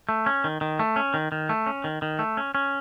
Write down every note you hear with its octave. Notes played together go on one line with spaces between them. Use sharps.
A3
C#4
D#3
D#3
A3
C#4
D#3
D#3
A3
C#4
D#3
D#3
A3
C#4
C#4